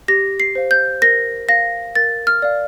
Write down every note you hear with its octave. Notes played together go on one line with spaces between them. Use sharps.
G4 A#6
C7
C5 F5
G6
A#4 A#6
F5 A#6
A#4 A6
F6
D5 F5